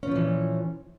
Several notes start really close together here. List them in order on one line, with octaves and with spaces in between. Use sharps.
C#4 F3 A#2 E3